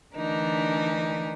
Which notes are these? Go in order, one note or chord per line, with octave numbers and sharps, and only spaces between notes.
D3 E3 A3 D4 D#4 A#4